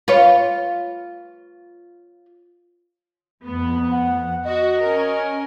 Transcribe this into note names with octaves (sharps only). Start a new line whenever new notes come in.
F4 B4 C#5
F2 B3
F#5
F#4 D#5
C#4 A#4